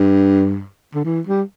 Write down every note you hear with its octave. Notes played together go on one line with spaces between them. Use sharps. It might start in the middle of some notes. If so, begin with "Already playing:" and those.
Already playing: G2
D3
E3
G3